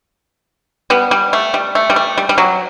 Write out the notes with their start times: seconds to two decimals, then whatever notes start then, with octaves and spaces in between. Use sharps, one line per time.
0.90 G3 B3
1.11 G3
1.33 A3
1.54 G3
1.75 A3
1.90 G3
1.96 A3
2.18 G3
2.29 G3
2.38 F#3